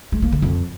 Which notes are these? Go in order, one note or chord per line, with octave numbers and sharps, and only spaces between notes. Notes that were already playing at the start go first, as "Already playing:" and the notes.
G#3
A#3
D3
F2